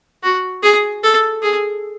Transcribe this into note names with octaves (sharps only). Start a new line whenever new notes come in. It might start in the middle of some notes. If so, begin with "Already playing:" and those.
F#4
G#4
A4
G#4